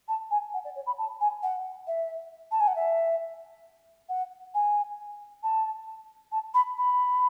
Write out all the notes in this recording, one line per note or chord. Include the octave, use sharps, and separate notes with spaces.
A5
G#5
F#5
D5
C#5
B5
A5
G#5
F#5
E5
A5
G#5
F#5
E5
F#5
G#5
A5
A5
B5
B5